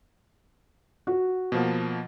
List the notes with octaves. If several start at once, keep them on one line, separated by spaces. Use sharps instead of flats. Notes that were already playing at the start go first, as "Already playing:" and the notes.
F#4
B2 F3 A#3